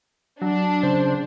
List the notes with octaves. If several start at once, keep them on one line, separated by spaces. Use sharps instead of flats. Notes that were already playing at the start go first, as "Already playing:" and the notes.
F#3 D4
C#3 C5